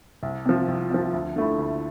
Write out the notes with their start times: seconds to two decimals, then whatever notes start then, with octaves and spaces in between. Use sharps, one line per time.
0.23 C2
0.45 C3 F3
0.68 C2
0.91 C3 F3
1.13 D2
1.36 D3 A3 E4
1.59 D2